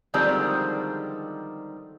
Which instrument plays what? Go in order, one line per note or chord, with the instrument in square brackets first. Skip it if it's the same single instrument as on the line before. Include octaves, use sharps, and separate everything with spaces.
[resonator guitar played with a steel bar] D3 D#3 F3 G3 G#3 C4